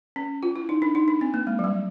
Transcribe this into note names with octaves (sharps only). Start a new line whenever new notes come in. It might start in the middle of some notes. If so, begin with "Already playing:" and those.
C#4
F4
E4
D#4
D4
D#4
D4
C4
A#3
G#3
F#3
G3